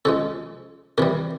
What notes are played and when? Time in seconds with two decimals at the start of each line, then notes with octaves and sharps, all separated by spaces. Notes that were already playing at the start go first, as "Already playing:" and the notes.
0.05 C#3 F3 G#3 A4
0.98 C3 E3 G3 A#4